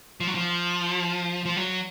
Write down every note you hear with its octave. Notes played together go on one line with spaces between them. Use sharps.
F3
F#3
F3
F3
F#3